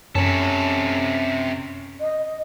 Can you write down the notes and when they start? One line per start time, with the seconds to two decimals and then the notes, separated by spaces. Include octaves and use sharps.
0.15 F#2 C3 C#4 A4
2.00 D#5